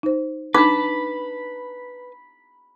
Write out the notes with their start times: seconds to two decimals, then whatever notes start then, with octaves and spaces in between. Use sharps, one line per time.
0.03 D#4 C5
0.54 D4 D#4 B4 A5 B5 D6